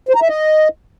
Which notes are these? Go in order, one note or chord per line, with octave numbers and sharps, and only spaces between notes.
C5
A#5
E5
D#5